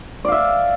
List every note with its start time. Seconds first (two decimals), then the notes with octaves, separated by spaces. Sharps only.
0.25 D5
0.28 F5
0.32 E5